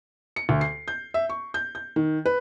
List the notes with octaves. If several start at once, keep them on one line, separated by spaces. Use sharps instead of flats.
C#7
D2
C7
G6
E5
C#6
G6
G6
D#3
B4